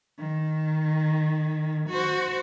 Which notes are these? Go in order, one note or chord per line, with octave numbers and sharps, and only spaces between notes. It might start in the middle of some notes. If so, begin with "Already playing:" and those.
D#3
F#4 C5